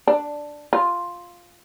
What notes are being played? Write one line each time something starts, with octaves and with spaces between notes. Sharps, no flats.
D4
F4